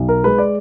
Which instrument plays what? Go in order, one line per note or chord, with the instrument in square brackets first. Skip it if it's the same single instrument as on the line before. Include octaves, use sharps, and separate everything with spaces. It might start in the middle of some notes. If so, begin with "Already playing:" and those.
Already playing: [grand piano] B1
A#4
G#3 B4
D5